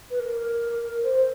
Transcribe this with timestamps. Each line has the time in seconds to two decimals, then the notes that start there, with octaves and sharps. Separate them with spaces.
0.10 B4
0.19 A#4
0.82 A#4
1.03 C5